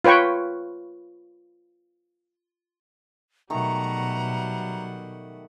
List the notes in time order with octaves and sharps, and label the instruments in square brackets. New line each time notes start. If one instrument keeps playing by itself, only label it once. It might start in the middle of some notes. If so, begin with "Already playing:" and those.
[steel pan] F4 B4 C#5 G5 C#6
[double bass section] B2 [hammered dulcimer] D#3 A3 C#6 [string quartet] F#3 G3 F#5 [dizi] A#5